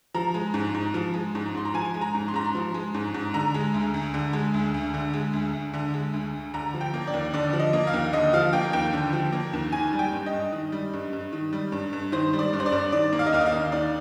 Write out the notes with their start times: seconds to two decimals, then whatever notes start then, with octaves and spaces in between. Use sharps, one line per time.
0.14 F3 A#5
0.34 G#3
0.54 G#2
0.74 G#2
0.94 F3
1.14 G#3
1.35 G#2
1.55 G#2 C6
1.65 A#5
1.74 F3 G#5
1.94 G#3
2.01 A#5
2.15 G#2
2.28 C6
2.34 G#2 A#5
2.44 C6
2.55 F3
2.74 G#3
2.94 G#2
3.14 G#2
3.34 D3 A#5
3.54 G#3
3.74 D2
3.94 D2
4.14 D3
4.33 G#3
4.54 D2
4.74 D2
4.94 D3
5.14 G#3
5.33 D2
5.53 D2
5.74 D3
5.94 G#3
6.14 D2
6.33 D2
6.54 D3 A#5
6.74 F3
6.81 G5
6.94 A#3
7.07 D5
7.14 D#2
7.34 D3 D5
7.53 F3
7.60 D#5
7.73 A#3
7.87 F5
7.93 D#2
8.13 D3 D#5
8.33 F3 F5
8.53 A#3 G5
8.73 D#2 G5
8.93 D3
9.13 F3
9.32 A#3
9.53 D#2
9.72 D#3 G#5
9.93 G3
9.99 G5
10.13 G2
10.26 D#5
10.33 G2
10.52 D#3
10.72 G3
10.93 G2
11.13 G2
11.33 D#3
11.53 G3
11.72 G2
11.93 G2
12.12 D#3 C5
12.33 G3
12.39 D5
12.53 G2
12.60 C5
12.66 D5
12.72 G2
12.92 D#3 D5
13.13 A#3
13.19 F5
13.26 D#5
13.33 D#2 F5
13.41 D#5
13.46 F5
13.52 D#2
13.72 D#3 D5